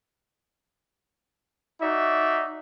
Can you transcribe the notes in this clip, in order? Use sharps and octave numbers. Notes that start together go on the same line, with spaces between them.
D#4 F#4 D5 E5